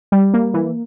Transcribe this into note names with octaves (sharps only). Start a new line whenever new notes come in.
G3
A#3
E3